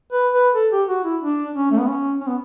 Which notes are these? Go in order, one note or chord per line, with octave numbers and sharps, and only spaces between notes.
B4
B4
A4
G4
F#4
E4
D4
C#4
A3
B3
C#4
C#4
B3